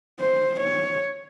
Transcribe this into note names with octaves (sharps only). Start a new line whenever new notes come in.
C5
C#5